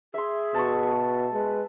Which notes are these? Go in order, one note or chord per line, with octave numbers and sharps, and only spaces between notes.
G#4 E5 C6
B2 A5 C#6
G#3 B4